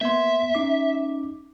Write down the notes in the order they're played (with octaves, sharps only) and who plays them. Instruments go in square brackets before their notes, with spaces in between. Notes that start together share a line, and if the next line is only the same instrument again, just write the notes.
[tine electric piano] A#3 B3 C6 [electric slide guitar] E5
[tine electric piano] C#4 D#4 D6